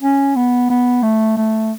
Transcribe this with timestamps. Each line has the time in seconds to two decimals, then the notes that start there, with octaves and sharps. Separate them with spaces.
0.02 C#4
0.36 B3
0.70 B3
1.03 A3
1.37 A3